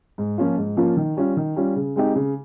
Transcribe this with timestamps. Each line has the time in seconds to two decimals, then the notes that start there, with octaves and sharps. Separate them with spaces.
0.18 G#2
0.38 F3 A#3 C#4 F4
0.57 G#2
0.77 F3 A#3 C#4 F4
0.97 D#3
1.17 G3 C#4 F4
1.37 D#3
1.56 G3 C#4 F4
1.76 C#3
1.96 G#3 C4 D#4 G4
2.15 C#3